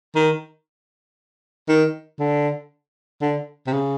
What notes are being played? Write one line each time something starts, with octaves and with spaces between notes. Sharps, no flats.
D#3
D#3
D3
D3
C3
C#3